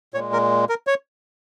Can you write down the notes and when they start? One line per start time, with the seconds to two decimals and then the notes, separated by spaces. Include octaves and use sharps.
0.14 A#2 G#3 C#5
0.33 A#4
0.69 A#4
0.87 C#5